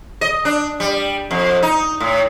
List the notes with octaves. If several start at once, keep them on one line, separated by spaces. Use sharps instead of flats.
D#5
D4
G3
F2
D#4
A2